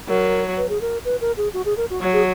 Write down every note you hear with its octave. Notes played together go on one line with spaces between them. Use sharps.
F#3 A#4
B4
G#4
A#4
B4
A#4
G#4
F#4
G#4
A#4
F#4
F#3
G#4